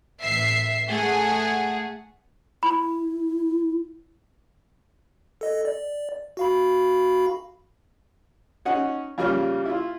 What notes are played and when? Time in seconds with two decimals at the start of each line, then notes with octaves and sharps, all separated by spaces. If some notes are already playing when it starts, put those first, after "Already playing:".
0.21 A1 E5 C7
0.88 A3 G#4 F#5
2.63 E4 B5
5.41 A4 D#5
5.65 D5
6.37 F#4 F5 B5
8.65 C#4 D#4 F#5
9.18 F2 C#3 G3 A#3 F6
9.65 E4 F4